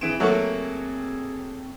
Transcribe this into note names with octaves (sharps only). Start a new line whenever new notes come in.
E3 C4 G#4 D7 E7
F#3 A3 A#3 A4 C#6